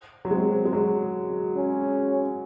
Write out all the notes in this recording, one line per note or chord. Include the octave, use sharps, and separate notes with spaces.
F#3
G#3 C4
G#3
F#3
C#4